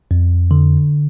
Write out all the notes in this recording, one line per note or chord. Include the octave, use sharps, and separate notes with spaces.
F2
D3